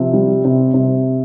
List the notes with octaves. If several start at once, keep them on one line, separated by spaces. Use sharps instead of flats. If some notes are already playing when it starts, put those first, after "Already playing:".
Already playing: C3 F3
G3
C3
C3